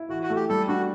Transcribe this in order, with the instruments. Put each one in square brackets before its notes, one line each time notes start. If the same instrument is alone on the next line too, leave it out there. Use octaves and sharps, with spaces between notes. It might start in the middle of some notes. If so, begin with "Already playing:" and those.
Already playing: [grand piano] E4
[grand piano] E3 [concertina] F#4
[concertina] F#4
[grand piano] A3
[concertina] G4
[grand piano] G3 [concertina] A4
[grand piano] D4 [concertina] F#4